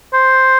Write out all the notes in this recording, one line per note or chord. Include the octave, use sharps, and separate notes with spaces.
C5